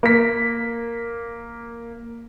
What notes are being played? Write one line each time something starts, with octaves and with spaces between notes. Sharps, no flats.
A#3 B6